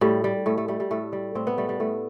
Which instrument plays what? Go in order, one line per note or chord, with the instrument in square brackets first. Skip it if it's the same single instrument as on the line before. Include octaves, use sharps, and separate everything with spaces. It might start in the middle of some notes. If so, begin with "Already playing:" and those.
[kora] A2 G3
G3
A2 A3
A3
G3 A3
G3
A2 A3
G3
A2 C4
B3
G3 A3
G3
A2 A3